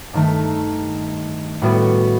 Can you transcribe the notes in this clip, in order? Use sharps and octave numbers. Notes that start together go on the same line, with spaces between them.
G2 D#3 A3
A2 G3 B3 F#4